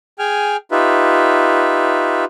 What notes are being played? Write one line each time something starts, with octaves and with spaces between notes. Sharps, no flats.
G#4 G5 G#5 F6
D#4 F4 G4 B4 E5